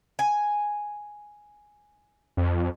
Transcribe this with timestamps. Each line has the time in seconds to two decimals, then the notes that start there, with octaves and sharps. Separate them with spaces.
0.19 G#5
2.37 F2